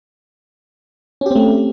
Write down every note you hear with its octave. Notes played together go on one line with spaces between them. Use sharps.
A3 C4 C#4 G4